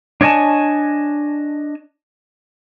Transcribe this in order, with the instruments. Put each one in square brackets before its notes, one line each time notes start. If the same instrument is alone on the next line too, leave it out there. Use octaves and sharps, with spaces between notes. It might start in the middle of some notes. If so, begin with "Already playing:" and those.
[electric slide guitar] D4 C#5 D#5 G#5 A5